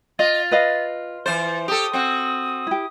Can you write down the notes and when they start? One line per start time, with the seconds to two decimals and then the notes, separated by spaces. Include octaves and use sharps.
0.19 F4 D#5 A6
0.51 B4 D#5 F5
1.26 E3 C5 A6
1.68 G4 A4 D#6
1.93 C4 F#4
2.67 E4 G4